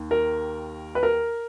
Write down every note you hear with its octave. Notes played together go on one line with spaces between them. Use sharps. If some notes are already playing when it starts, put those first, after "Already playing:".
Already playing: D#2 D#3
A#4
B4
A#4